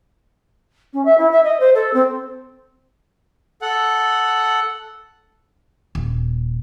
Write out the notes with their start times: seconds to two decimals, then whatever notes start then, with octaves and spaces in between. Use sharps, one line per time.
0.93 C#4
1.05 E5
1.18 E4
1.31 E5
1.43 D#5
1.60 C5
1.74 A4
1.93 C4
3.62 A4 F#5
5.95 D#1